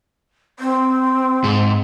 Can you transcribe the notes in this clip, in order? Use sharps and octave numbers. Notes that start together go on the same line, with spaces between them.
C4
G#2